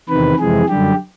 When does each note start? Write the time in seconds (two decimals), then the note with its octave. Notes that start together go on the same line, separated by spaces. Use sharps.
0.09 E2 C3 D#3 B4
0.39 F2 C3 E3 G#3 G#4
0.69 F#2 D3 G3 G4